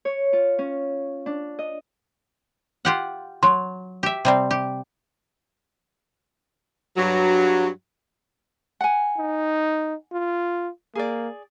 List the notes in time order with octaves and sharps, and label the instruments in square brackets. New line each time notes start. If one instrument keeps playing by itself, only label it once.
[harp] C#5
F4
C#4
D4
D#5
[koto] F4 G4 F#5
[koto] F#3 [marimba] C6
[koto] G4 E5
C3 G3 C4
G4
[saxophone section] G2 F#3
[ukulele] F#5 G#5
[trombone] D#4
F4
[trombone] A#3 [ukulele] G#4 D5